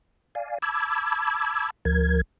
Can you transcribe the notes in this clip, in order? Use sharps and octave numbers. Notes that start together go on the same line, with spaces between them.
D5 F5 G#5
A5 B5 D6 E6 G#6
D2 F3 A#4 G#6